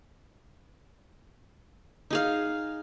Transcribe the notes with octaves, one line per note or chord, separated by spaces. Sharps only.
D#4 G#4 F5